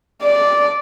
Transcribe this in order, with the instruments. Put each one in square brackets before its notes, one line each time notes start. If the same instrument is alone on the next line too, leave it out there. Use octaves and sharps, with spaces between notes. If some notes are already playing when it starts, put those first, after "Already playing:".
[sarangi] D5